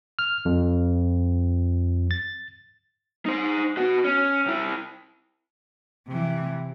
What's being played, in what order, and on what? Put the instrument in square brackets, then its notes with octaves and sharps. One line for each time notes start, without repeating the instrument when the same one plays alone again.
[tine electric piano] F6
F2
A6
[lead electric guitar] D#4 C5
B2 F#4
C#4
C3 E4
[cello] C3 E3